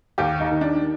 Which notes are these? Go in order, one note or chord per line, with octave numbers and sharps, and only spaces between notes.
D#2 G4
D#4
D#3
D4